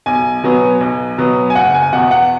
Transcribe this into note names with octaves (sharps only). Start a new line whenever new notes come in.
B1 G#5
B2 F#3 B3
B1
B2 F#3 B3
G#5
F#1 F#5
G#5
E2 B2 F#5
F#5